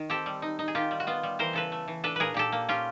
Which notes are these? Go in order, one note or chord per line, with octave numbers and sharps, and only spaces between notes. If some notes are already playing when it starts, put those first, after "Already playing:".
Already playing: D#3
C4 G4 A4
G3
D#4
D#4
G#4
D#3 F4 G4
G3
F#4
B3 F4
G3
E3 A#4 C5
C#3 A4 B4
A3
E3
D4 A4 B4
A#2 G#4 A#4 B4
A#2 G4 A4
A#3
C#4 F4 G4